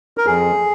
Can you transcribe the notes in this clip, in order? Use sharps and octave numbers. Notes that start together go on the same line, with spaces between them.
A#4
F2 G#4